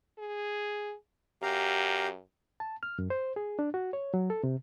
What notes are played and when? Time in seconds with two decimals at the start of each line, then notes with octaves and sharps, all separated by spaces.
0.18 G#4
1.43 F#2 G4 F5 A#5
2.60 A5
2.83 F6
2.99 F#2
3.10 C5
3.36 G#4
3.59 D4
3.74 F#4
3.93 C#5
4.14 F#3
4.30 A4
4.43 C3